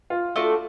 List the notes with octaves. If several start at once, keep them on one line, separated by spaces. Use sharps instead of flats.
F4
A3 D4 F4 F#4